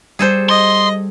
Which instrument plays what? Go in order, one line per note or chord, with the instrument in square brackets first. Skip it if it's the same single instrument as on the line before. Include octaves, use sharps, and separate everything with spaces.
[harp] G3 [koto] G#4 A4 C5
[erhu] D#5 [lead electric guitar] C6